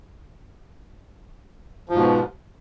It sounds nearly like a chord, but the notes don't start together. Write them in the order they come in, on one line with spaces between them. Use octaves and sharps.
F3 G#2 B2